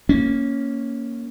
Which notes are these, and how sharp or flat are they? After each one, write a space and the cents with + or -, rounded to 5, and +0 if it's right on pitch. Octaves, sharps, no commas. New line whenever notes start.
A#3 +0 C#4 +0